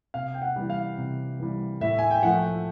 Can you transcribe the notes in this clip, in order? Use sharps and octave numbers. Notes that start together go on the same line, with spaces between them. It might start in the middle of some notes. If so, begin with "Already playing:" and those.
C3 F5
G5
F#5
E3 G3
F5
C3
E3 G3
A2 E5
G#5
G5
F3 A3 F#5